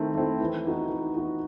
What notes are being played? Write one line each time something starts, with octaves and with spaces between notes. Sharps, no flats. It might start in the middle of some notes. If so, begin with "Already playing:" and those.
Already playing: D#3 A3 C4 E4
A3 C4 E4
E3
B3 D#4 F#4
E3
B3 D#4 F#4